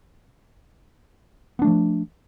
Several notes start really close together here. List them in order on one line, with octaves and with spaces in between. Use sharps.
B3 D4 A3 F3